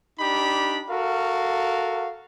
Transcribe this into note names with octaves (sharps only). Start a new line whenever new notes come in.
D4 D#4 G4 B5
F#4 A4 A#4 F5